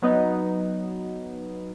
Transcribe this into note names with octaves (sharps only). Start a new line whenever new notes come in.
F#3 B3 D#4